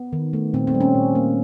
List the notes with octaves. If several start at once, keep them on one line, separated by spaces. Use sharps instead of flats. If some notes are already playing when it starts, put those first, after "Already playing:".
Already playing: B3
D#3
A3
A#2 C4
C4
G3
C#4
A#2
A#3